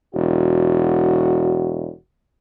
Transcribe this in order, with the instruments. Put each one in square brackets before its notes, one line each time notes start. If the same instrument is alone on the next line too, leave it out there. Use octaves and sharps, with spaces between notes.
[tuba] E1 [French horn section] F#4